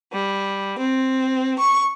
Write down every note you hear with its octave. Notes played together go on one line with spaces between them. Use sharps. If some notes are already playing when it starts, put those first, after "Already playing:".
G3
C4
C#6